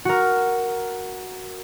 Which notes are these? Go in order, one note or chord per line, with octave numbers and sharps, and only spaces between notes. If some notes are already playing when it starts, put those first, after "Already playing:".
F#4 A#4